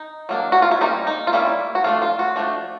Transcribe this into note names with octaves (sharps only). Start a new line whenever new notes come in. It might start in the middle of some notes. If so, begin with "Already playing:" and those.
Already playing: D#4
F#3 A#3 D4
F#4
F4
E4
G3 A#3 C#4 D#4
D#4
F4
G3 A#3 C#4 E4
F#4
F3 A3 D4 F4
F4
F#4
F3 A3 D4